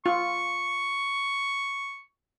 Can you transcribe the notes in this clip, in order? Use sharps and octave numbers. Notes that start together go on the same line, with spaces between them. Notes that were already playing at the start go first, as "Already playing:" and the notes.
F4 C#6